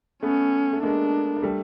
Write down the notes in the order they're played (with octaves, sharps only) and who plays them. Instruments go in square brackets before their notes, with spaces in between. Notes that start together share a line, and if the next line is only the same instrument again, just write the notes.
[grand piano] A3 B3 [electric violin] C#4
[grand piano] A3
[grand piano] G#3 A#3 [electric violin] D4
[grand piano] A#3
G3 A3